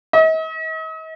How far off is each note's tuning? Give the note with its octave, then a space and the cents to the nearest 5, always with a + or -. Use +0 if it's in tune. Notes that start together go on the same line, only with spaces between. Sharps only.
D#5 +45